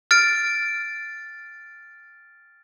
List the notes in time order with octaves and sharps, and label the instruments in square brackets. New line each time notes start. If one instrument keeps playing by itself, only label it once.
[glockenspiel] F6 A6 D7